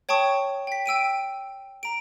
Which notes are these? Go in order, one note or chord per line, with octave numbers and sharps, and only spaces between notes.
C#5 G5 A5 C#6 D#6
G5 B6
G5 E6 D7 D#7
A#5 D7